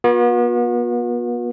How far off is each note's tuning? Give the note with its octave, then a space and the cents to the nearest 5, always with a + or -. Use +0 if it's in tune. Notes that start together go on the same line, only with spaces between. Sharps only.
B3 -40 F#4 -45